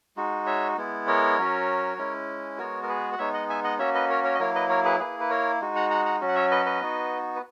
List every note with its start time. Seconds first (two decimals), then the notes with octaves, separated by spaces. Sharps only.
0.16 G#3 D#4 F#4
0.47 C#5 E5
0.78 G#3 B3 E4
1.07 A#4 C#5
1.38 F#3 C#4 F#4
1.98 G#3 C#4 E4
2.58 G#3 B3 F#4 A#4 C#5
2.83 A#4
2.88 G#4 B4
3.12 F#5
3.18 G#3 B3 D#4 C#5 E5
3.34 D#5 F#5
3.49 E5 G#5
3.64 D#5 F#5
3.79 A#3 C#4 F#4 C#5 E5
3.94 B4 D#5
4.10 A#4 C#5
4.24 A#4 C#5
4.35 D#5
4.39 F#3 A#3 E4 A#4 C#5
4.55 B4 D#5
4.69 A#4 C#5
4.85 G#4 B4
4.99 A#3 E4 G#4 B4
5.20 B4
5.30 A#4 C#5
5.61 G#3 D#4 F#4
5.76 F#5 A#5
5.90 F#5 A#5
6.06 F#5 A#5
6.21 F#3 C#4 F#4
6.28 F#5
6.35 C#5 E5
6.51 B4 D#5
6.66 B4 D#5
6.81 B3 D#4 F#4
7.36 B4